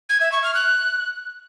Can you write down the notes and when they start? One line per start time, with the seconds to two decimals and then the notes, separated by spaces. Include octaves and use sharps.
0.09 G#6
0.21 E5
0.32 C#6
0.43 F6
0.55 F#6